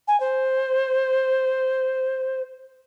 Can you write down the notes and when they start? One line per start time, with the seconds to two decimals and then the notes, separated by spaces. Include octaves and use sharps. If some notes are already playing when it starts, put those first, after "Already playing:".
0.08 G#5
0.20 C5